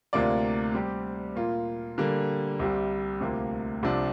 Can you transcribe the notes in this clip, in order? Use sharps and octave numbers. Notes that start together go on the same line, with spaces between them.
D2 C3 A#3 F4 D5
G3 C4 G4
A#2 A#3 F4
D3 G3 A#3
C2 C3 G3
D2 C3 A#3 F4
C2 C3 F3 D4